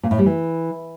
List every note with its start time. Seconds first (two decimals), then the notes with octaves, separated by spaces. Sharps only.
0.03 A#2
0.11 A2
0.18 G3
0.26 E3